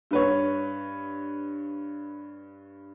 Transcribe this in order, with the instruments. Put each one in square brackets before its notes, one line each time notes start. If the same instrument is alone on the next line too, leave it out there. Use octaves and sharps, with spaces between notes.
[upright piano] G2 B4 C#5